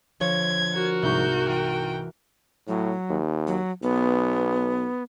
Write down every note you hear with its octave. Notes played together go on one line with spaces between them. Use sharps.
D3 F3 C#5 G#6
F#4 A#4
C2 G#2 C#6 G6
E3 G5
A2 F#3
D#2
F#3
B1 B3